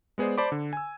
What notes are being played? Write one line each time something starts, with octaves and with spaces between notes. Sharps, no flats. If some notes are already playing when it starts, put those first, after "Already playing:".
G#3 B3 G#4 C5 D5
C5 D5 A5 B5 D6
D3
G#5 E6